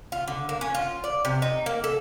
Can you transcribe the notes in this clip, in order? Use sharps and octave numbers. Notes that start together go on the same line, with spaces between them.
F4
D3
A#3
C#4
F4
D5
C3
D#4
A#3
A4